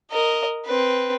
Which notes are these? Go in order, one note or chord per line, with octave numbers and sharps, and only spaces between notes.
A#4 D#5
C4 B4